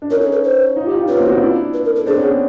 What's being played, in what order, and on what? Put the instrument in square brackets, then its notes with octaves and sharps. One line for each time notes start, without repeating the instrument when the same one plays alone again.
[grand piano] D4
[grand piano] C#4 D#4 [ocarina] A#4
[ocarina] A4
B4
C5
[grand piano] D#4 F4
F4 G4
D#4 F4
[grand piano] B3 C#4 [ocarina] B4
[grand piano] A#3 C4
E4 F#4
D#4 F4
D4 E4
[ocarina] B4
A#4
A4
[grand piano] C4 D4 [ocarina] G#4
[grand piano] B3 C#4
B3